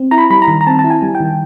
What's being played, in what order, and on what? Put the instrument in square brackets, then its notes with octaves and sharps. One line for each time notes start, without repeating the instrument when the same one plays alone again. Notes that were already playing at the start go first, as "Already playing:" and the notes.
Already playing: [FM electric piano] C4
E4 A#5
B5
G3 B5
A#5
D#3
A#5
C4 A5
A5
E4
G#5
G3
G5
D#3